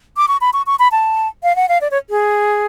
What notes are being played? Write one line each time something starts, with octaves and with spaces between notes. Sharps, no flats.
D6
C#6
B5
C#6
C#6
B5
A5
F5
F#5
F5
D5
C#5
G#4